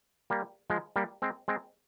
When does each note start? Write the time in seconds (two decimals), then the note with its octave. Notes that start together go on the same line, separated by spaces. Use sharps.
0.30 G3 A#3
0.70 F3 G#3
0.96 G3 A#3
1.22 G#3 C4
1.48 G#3 C4